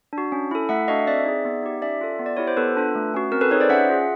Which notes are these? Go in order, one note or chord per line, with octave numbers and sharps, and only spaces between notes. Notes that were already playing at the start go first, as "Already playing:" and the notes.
D4
F#4
C#4
E4 A4
A3 E5 F#5
D4 F#4 A4 D#5 F5
C4 D5 E5
D#4 G#4
B3
D#4 G4
C#4 D5 E5
F4 A4
B3
D5
E4 G4 C#5
C5
B3 A4 B4
D4 F4 A4
A3
C#4 F#4
C4 A#4
A4 B4
D#4 G#4 B4 C#5
C5 D5
C#4 E5 F#5
F4 G#4